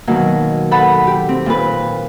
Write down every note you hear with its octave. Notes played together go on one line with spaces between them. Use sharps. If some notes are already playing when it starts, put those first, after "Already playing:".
B2 D#3 F#3 A#3
A4 B4 F#5 B5
G4
C4
A#2 B4